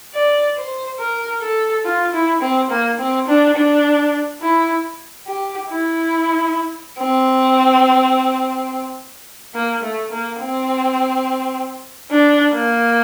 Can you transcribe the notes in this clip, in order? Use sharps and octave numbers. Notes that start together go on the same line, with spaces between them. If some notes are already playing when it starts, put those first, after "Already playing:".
D5
C5
A#4
A4
F4
E4
C4
A#3
C4
D4
D4
E4
G4
E4
C4
A#3
A3
A#3
C4
D4
A#3